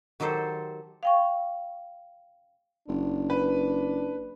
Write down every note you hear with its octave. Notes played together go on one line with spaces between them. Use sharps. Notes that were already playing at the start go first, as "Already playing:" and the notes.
D#3 F#3 G4 A4 C5
F5 G5 C#6
F#1 D4
B4